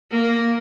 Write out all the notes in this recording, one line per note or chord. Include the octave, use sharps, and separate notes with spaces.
A#3